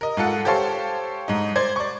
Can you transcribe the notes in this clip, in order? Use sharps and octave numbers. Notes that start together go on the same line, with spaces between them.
A#4 D#5
G#2 F4 A4 F#5
G4 A4 C5 C#5 F5 A5
G#2 D#4
C5 D5 G#6
D5 C#6